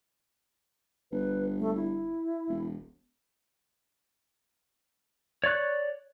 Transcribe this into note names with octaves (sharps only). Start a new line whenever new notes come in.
G1 B4
A3
E4
E1
C#5 D5 C#6 F#6